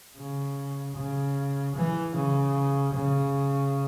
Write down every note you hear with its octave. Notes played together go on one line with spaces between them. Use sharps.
C#3
C#3
E3
C#3
C#3